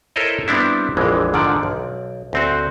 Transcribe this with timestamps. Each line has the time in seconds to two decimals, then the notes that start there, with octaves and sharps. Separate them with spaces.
0.16 E4 A4 A#4 C5 C#5 D#5
0.48 G3 B3 C4 D4 E4
0.97 A#1 F2 D3 E3 G#3
1.33 G#2 D3 D#3 F3 D5
1.63 B1
2.33 D2 C4 F#4